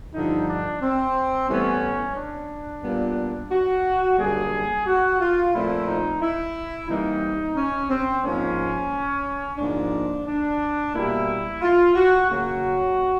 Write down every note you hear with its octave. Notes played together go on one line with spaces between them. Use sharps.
G2 D3 F3 D#4
D4
C4
A2 E3 G3 B3 C#4
D4
A#2 G3 B3
F#4
F#2 D3 G3 A#3 G#4
F#4
F4
A#2 F3 A3 C4 E4
D#4
E4
C3 E3 G3 A#3 D#4
C#4
C4
G#2 F3 A#3 C#4
G#2 F3 A#3 D4
D4
B2 G3 A#3 E4
F4
F#4
C#3 F#3 A#3 F#4